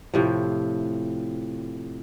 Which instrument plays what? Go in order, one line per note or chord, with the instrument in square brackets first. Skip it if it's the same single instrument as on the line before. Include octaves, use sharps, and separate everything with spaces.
[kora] A2 C3 F3